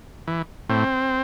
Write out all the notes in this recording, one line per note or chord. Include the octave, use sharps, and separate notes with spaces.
E3
A2 C4